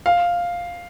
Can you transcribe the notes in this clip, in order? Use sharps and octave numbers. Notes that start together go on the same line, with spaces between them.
F5